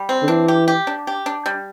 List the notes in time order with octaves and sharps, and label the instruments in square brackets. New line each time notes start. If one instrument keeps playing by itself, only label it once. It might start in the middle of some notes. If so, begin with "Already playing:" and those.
Already playing: [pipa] G3
C4
[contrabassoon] D3
[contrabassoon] E3 [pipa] D4
[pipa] G4
G4
D4
G4
D4
G3